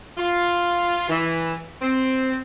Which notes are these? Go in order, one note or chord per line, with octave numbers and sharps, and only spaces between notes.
F4
E3
C4